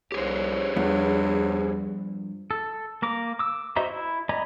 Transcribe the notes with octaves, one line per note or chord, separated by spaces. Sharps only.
C2 G4 G#4 C5 C#5
E2 G2 F3 B3
A4
A#3 A#5 D6
D6 E6
F#4 C5 D#5 E5 A#5
E4
D5 D#5 G#5 A#5 B5